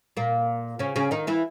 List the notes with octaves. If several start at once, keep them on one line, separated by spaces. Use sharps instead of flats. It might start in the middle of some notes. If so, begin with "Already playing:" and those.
A#2 A#3
C#3 C#4
C#3 C#4
D#3 D#4
E3 E4